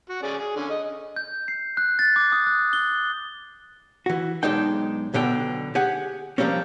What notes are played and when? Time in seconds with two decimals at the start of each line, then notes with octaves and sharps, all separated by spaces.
0.09 F#4
0.23 C#4 G#4 D5
0.39 G#4
0.56 D3 C#4
0.69 D#5
1.16 G6
1.48 C7
1.77 F#6
1.99 A6
2.16 D6
2.32 D#6
2.46 F#6
2.73 G7
4.06 E3 F#4
4.43 B1 G#3 D4 D#4 G5
5.14 B1 B2 D3 G5
5.75 G4 G#4 F#5
6.38 F3 G3 A#3 C4 C#4